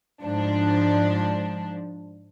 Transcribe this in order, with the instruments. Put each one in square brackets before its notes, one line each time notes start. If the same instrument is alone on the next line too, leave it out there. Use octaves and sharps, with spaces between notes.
[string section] G#2 F3 D4